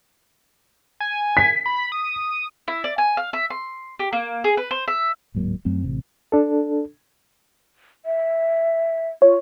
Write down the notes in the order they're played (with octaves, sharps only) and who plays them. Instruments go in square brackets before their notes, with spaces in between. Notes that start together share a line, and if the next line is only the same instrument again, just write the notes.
[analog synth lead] G#5
[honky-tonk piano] B6
[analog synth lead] B5
D#6
[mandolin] E4
D5
G#5
F5
E5
C6
G4
A#3
G#4
B4
C5
E5
[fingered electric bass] D1 G#2 F#3 A#3
F#2 F#3 A3 C4
A1 C3
[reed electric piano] D4 A4
[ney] E5
[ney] F4 [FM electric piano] C#5